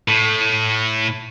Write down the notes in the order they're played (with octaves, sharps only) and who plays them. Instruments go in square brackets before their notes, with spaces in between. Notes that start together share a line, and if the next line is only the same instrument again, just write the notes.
[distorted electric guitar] A2